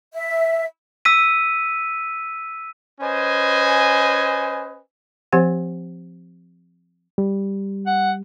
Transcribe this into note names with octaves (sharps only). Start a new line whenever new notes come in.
E5
E6 B6 D#7
C#4 B4 C5 D#5 G#5
F3 C4 G4 C5 F#5
G3
F#5